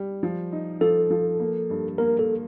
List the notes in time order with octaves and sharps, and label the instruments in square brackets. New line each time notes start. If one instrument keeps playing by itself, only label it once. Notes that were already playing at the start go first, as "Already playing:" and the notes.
Already playing: [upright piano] G3
F3
D#4
[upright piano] F3 [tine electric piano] A4
[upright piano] F3
A#3
G2
[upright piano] A#3 [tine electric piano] A#4
[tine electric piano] A4